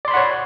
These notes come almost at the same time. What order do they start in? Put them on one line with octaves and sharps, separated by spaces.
D5 C6 B5 F#5 C#5